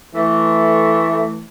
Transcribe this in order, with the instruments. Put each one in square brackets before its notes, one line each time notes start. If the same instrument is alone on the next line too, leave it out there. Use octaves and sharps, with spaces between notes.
[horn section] E3 A3